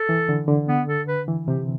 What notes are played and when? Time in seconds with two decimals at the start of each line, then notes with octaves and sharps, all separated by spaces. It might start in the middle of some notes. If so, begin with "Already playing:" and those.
Already playing: A4
0.09 E3
0.29 D3
0.48 D3
0.68 B3
0.88 A4
1.08 B4
1.28 E3
1.48 C3 G4